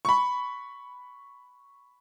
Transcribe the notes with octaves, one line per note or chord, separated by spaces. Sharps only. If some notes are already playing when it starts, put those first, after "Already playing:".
B5 C#6